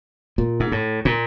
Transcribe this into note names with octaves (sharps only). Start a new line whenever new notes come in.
A#2
G#2
A2
A#2